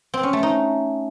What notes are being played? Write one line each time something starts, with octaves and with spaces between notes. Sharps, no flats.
C4
C#4
A3
D#4